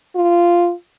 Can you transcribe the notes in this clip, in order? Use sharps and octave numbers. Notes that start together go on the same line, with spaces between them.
F4